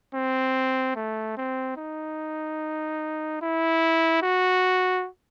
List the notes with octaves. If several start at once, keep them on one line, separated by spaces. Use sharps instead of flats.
C4
A3
C4
D#4
E4
F#4